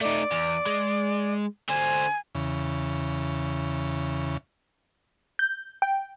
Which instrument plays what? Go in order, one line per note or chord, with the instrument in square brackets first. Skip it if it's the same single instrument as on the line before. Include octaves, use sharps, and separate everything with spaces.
[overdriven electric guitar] A3 D#4 [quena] D5
[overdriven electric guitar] E2
G#3
[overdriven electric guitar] D3 C5 [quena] G#5
[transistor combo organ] E2 C#3
[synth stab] G6
G5